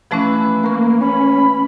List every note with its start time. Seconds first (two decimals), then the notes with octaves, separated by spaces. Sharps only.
0.11 E3 F3 A3 C#4 E4 B4
0.63 A#3 A#5 C#6
1.01 C#4 B5